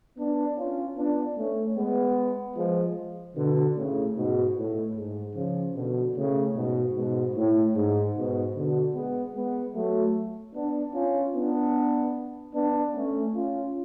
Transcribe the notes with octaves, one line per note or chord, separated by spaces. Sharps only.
B3 D4
C#4 F4
B3 D4
A3 C#4
G#3 B3
F3 G#3
B2 D3
A2 C#3
G#2 B2
A2
G#2
C#3 F3
B2 D3
A2 C#3
G#2 B2
G#2 B2
A2
G#2
G#2 B2
B2 D3
G#3 B3
G#3 B3
F#3 A3
B3 D4
C#4 F4
B3 D4
B3 D4
A3 C#4
C#4 F4